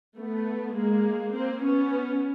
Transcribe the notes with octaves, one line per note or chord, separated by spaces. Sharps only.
A3 B3
G#3 A#3
A#3 C4
B3 C#4